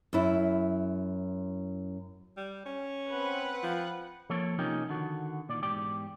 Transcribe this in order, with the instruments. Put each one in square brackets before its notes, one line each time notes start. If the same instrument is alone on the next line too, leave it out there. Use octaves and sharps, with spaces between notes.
[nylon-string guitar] F#2 E4
[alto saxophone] G3
C#4
[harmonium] C4 [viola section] B4 F#5
[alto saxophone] F3
[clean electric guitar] F3 A#3 C4 A4 C#5
C3 F3 A#3 C#4 D#4 G4
D3 D#3 F#4
A#2 D#3 D5
E2 G#2 G4 D5